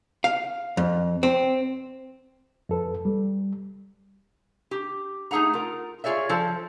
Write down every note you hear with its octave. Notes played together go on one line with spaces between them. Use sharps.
F5
F2
C4
F2 A4 B4
G3
G4
A3 D#4 G#4 F#5 A#5
F4 A#4
F4 G#4 C#5 D5 E5
F3 A4 C5 A5